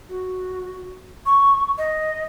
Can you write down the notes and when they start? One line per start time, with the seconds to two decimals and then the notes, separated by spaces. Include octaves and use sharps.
0.09 F#4
1.26 C#6
1.78 D#5